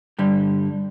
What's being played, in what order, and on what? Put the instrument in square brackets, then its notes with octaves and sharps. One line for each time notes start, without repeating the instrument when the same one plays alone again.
[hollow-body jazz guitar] G2 D3 G3